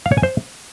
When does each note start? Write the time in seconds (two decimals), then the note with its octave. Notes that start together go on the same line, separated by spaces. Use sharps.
0.06 F5
0.12 C#5
0.17 G#5
0.23 C5